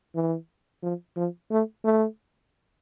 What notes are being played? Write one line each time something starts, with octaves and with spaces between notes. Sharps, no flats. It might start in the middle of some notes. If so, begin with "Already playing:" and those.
E3
F3
F3
A3
A3